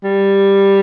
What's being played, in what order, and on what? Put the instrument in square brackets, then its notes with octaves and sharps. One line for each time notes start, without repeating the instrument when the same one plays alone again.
[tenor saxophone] G3